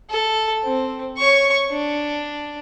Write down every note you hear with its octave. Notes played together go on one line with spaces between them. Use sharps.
A4
C4
C#5 C#6
D4